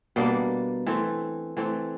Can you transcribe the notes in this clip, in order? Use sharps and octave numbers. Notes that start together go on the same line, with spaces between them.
B2 G3 A#3 D4
E3 A3 C4
E3 A3 C4